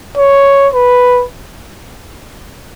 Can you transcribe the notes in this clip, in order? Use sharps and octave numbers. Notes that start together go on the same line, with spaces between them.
C#5
B4